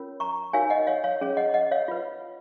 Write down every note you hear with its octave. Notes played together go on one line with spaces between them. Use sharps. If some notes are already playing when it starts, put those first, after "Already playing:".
Already playing: C#4 F4 A#4 C#5
A#5 C#6
D#4 F#4 A#4 C#5 F5 G#5
D#5 F#5
C#5 F5
C#5 F5
C#4 G#4 C#5
D#5 F#5
D#5 F#5
C#5 F5
F4 B4